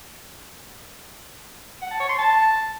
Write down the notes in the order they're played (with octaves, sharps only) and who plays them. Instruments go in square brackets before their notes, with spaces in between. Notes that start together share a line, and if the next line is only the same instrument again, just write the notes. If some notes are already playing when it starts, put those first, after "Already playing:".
[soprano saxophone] F#5
A5
C#5
C6
A5